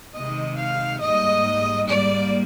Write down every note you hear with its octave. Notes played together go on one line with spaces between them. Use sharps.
C3 D#3 G#3 D#5
F5
G#2 G3 A#3 D#5
G#2 G3 A#3 D5